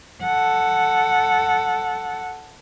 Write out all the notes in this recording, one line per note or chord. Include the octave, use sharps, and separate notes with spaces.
A4 F#5